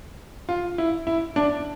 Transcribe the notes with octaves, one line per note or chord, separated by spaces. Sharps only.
F4
E4
E4
D4